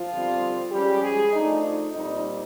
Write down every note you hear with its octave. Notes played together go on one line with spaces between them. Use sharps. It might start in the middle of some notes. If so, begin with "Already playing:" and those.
Already playing: F3 F4
D3 G3 C4
F3 G3 G#3 C#4 G4
G#3 G#4
F3 A3 D4 D#4
D#4
A#2 G3 C4 D#4